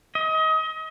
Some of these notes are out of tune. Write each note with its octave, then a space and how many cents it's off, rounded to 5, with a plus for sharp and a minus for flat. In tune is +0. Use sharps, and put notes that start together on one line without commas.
D#5 +30